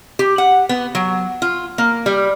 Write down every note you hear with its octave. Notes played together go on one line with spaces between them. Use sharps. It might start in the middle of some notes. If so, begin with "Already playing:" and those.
G4
F#5
B3
F#3
F4
A#3
G3